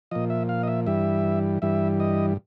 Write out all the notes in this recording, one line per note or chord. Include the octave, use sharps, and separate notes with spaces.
A#2 F3 D#5
E5
F5
D#5
E5
G2 E3 G3 E5
G2 E3 G3 E5
D#5